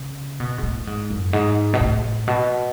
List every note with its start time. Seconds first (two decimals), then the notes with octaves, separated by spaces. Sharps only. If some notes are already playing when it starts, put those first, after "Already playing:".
Already playing: C#3
0.40 B2
0.58 G#2
0.63 A2
0.87 G#2
1.10 F#2
1.33 G#2
1.74 B2
1.81 A2
2.28 B2